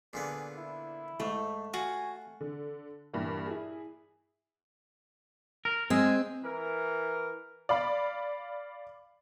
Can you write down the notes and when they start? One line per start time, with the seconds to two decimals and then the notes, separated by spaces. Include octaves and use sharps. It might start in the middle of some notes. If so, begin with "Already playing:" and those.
0.13 A#2 D3 B3 G#4
0.57 E4
1.20 G#2 A3
1.74 F4 F#4 G#5
2.41 D3
3.13 G2 A#2 E3 G3
3.47 E4 G#4
5.65 A#4
5.90 G#3 C4 G#4
6.44 E3 A#4
7.69 D5 F5 B5